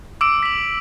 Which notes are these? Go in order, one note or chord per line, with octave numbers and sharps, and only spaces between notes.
D6 E6 D7
B6 F#7